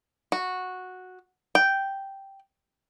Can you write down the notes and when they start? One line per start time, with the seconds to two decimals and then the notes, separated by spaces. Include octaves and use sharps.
0.32 F#4
1.55 G5